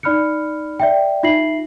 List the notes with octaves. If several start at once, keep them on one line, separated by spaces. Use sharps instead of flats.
D#4 D5 B5 F6 F#6 C#7
D5 E5 G5
D#4 F4 E5 A#6 C7 F#7